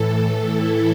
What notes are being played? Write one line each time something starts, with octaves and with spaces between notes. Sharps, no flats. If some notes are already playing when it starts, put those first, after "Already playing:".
Already playing: A2 E3 A4
E4